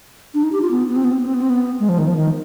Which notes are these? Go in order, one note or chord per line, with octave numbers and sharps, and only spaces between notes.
D4
D#4
G4
F4
B3
B3
C4
B3
C4
B3
C4
B3
C4
B3
G#3
F3
D#3
F3
D#3